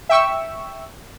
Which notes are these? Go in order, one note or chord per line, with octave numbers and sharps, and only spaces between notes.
E5 G5 C#6 E6